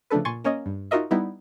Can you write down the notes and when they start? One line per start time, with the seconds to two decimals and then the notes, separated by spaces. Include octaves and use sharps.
0.11 C#3 F3 A3 D4 A4 B4
0.25 A#2 G#5 C6 C#6 A6
0.44 A#3 C#4 C#5 D#5
0.66 G2
0.91 D#4 F4 F#4 A#4 D#5 E5
1.11 G3 B3 D#4 E4